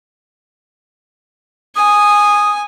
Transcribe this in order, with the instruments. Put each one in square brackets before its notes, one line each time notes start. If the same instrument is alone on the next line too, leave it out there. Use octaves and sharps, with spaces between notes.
[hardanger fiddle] G#5 [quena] D#6